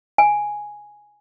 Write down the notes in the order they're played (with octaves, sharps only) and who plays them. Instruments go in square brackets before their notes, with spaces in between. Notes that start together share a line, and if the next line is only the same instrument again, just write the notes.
[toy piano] G#5